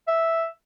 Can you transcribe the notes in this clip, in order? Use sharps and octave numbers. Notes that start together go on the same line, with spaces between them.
E5